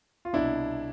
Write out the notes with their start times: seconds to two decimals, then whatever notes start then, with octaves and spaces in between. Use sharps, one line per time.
0.25 F4
0.33 C2 B2 D4 E4